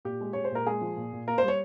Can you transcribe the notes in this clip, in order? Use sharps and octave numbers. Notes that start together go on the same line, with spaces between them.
A#2 G4
G#3
G#3 C#5
C5
A#2 A#4
G#3 G#4
F3
A#2
A#2
A#3 A#4
C5
G3
C#5